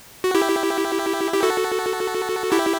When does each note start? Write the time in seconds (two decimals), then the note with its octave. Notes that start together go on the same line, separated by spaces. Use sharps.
0.24 F#4
0.35 E4 G4
1.33 G4
1.43 F#4 A4
2.52 E4 G4